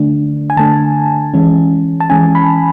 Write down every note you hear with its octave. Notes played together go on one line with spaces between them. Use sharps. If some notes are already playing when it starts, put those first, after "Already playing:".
Already playing: D3 A3 D4
G#5
D3 A3 D4 A5
E3 G#3 C#4
A5
E3 G#3 C#4 G#5
B5